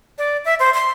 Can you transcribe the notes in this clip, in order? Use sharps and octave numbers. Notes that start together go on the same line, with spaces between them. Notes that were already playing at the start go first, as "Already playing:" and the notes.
D5
E5
C5
C6